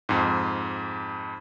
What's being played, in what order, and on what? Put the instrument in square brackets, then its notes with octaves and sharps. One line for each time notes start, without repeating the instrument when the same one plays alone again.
[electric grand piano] F2 G#2